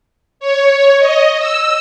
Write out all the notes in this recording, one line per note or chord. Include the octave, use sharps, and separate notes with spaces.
C#5
D#5
E6